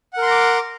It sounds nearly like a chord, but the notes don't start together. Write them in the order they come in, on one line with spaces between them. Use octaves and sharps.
F#5 A#4 C6 A#5 D6